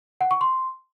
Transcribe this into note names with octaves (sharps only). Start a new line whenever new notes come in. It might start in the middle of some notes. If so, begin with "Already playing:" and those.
F#5
C#6
C6